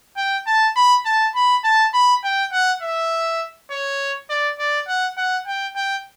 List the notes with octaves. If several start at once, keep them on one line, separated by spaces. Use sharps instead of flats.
G5
A5
B5
A5
B5
A5
B5
G5
F#5
E5
C#5
D5
D5
F#5
F#5
G5
G5